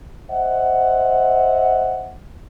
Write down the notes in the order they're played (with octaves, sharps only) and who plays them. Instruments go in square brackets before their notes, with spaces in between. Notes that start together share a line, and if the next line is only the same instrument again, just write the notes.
[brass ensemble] C5 D#5 E5 F#5